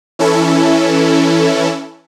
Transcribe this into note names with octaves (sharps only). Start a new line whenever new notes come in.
E3 C#4 E4 A4